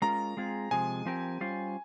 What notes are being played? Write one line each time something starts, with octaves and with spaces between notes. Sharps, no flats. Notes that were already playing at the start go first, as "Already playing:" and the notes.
G#3 C#4 F4 A#4 A#5
G#3 C4 F4 G#4
C3 F3 G#3 G#5
F3 C4 G4 A#4
G3 C#4 F4 C5